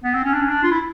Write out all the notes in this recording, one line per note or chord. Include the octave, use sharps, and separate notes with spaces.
B3
C4
C#4
D4
C#4
D4
F4
E4